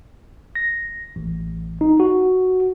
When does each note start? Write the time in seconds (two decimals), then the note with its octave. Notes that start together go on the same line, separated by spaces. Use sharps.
0.55 A#6
1.16 A1
1.81 D#4
2.00 F#4